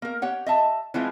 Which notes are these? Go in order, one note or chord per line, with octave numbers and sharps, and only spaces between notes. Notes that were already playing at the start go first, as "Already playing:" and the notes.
A#3 A#4
G4 C#5 F#5
D#5 E5 A5
E3 F3 G#3 C4 E4 F4